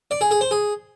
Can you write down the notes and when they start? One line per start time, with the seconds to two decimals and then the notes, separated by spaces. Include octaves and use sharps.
0.11 D5
0.21 G#4
0.31 G#4
0.41 C5
0.51 G#4